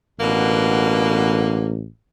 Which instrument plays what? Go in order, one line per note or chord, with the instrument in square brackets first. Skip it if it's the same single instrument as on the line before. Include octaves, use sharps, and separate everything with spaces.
[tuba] A1 [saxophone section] B2 D3 A#3